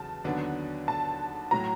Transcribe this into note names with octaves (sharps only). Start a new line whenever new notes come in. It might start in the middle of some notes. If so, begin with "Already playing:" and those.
Already playing: E2 C#3 F#3 A5
D#2 D3 F#3 B3 D4
A5
A2 F#3 A#5